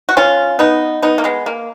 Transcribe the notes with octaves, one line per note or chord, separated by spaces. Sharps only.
F#4
C#4 F4
B3 D#4
B3 D#4
A#3
G#3 B3
A#3